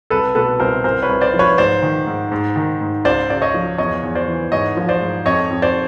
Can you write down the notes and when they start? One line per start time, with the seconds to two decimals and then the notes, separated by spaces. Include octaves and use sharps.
0.10 C2 A4 B4
0.35 B2 A4 B4
0.60 C2 A#4 C5
0.84 C2 A#4 C5
1.03 B4 C#5
1.09 C2
1.21 C5 D5
1.33 F3
1.39 B4 C#5
1.58 G#2 C5 D5
1.82 D#3
2.07 G#2
2.32 G#2
2.56 D#3
2.81 G#2
3.05 C#2 C5 D5
3.30 C#2 D5
3.42 C#5 D#5
3.54 F3
3.78 E2 C#5 D#5
4.03 E2
4.15 C5 D5
4.28 E3
4.52 G#2 C#5 D#5
4.77 F3
4.89 C5 D5
5.01 G#2
5.26 F2 C#5 D#5
5.50 F2
5.62 C5 D5